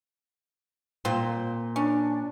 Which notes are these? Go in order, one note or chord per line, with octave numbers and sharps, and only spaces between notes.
A#2 C4 F4 C5
C#4 D4